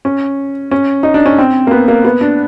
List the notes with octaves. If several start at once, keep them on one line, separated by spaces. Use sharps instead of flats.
C#4
C#4
D#4
D4
C#4
C4
A#3
B3
A#3
B3
D4